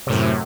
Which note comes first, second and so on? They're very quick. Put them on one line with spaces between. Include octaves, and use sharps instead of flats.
C3 A2 F#2